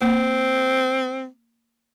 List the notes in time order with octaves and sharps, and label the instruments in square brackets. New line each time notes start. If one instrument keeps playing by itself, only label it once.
[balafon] A#3 [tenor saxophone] C4